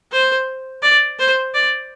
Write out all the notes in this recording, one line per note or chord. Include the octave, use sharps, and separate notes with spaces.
C5
D5
C5
D5